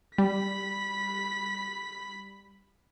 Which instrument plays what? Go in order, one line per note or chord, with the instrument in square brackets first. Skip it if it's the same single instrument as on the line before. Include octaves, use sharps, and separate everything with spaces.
[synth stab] G3 [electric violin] B5 B6